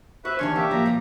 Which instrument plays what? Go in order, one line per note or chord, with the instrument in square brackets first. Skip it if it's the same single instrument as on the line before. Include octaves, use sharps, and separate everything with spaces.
[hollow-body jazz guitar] F#4 [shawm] B4 [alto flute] C5 [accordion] E5
[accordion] C3 C#6 [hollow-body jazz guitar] D#3 E3 C6 [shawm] C#4 [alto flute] D4
[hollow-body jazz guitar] A#3 [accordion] G4 E5
[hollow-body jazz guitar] A2 F3 F#3 [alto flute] A#3 [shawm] A#5
[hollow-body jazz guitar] F3 G3